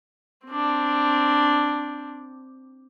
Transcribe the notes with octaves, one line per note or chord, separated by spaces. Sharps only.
C4 D4